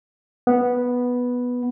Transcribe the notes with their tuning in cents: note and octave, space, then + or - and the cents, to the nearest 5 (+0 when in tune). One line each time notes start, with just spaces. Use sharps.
B3 -5